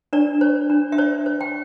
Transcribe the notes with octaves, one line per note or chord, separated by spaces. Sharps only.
D4 D5
C5
D4
E5
C5 D5
C5
G5